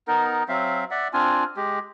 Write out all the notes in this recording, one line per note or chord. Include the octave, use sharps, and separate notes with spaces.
B3 D#4 A#4
F#3 C4 E5 F5
D5 E5 F#5
C4 D4 F4 G#5
G#3 G4